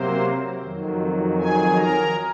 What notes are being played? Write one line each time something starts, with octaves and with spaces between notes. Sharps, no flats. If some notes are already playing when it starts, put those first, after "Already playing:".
Already playing: C3 F#3 A#3 C4 C5
F2 D#3 F#3
G#4 G#5
A#4 A#5